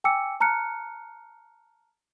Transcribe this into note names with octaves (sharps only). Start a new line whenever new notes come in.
G5 G#5 D6 E6 C#7
A5 A#5 F6 F#6 C#7